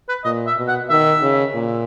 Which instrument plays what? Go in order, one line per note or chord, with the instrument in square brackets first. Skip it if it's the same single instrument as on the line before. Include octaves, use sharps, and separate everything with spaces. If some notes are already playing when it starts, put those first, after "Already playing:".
[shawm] B4
[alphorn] A#2 [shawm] D#5
[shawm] E5
[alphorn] B2
[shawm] F#5
[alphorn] D#3 [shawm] E5
[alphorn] C#3
A#2